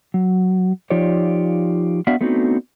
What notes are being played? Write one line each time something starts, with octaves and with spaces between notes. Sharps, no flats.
F#3
F3 D#4 F4 G4 C#5 D5
B3 D4 F#4 E5 F5
A3 B3 C4 D4 D#4 F#4